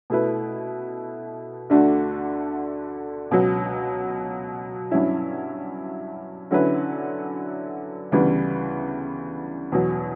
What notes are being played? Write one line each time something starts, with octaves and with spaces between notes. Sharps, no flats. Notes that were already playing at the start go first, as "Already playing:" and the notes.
B2 A3 E4 B4
D2 D3 A3 D4 F#4
C#2 B2 F#3
G2 F#3 C#4 E4
D3 F#3 C#4 E4 B4
D2 C#3 E3 G3 B3
E2 B2 F#3